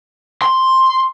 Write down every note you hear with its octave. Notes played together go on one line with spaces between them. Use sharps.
C6